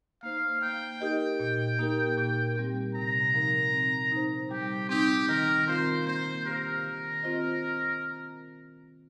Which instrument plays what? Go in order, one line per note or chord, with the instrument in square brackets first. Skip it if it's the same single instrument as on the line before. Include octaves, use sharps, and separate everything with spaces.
[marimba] A#3 D#4 C5 [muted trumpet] F5
[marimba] A#3 [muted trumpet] G5
[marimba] D#4 G4 A#4 D#5
A#2
A#3 D#4 G4 A#4
A#2
G3 C4 G4
[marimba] C3 [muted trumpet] A#5
[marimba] F3 D#4 A#4
C4
D#4 C5
[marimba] G3 [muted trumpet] G4
[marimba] C4 D#4 [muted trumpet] G4
[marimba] D#3 [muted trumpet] A#4
[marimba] C4 F4 A#4 F5 [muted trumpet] C5
[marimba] A#3 [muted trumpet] C5
[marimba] G4 C5 F5 [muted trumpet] A#4
[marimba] D#3
C4 F4 C5 D#5